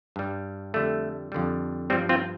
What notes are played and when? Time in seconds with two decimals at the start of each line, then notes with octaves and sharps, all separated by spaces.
0.16 G2 G3
0.74 F2 D3 G3 A3
1.32 F2 D3 G3
1.90 G2 F3 G3 C4
2.09 C4 F4